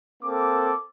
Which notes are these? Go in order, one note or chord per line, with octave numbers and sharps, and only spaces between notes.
A#3 C4 A4 D6